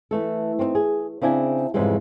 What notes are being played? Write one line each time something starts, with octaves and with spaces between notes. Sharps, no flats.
E3 A3 A4
C4 C#4 D#4
G#4
C#3 C4 D4 E4 G#5
F2 G#2 C#3 E3 G3 G#3